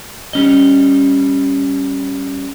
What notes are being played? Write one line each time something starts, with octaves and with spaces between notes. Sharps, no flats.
G3 C#4 D#5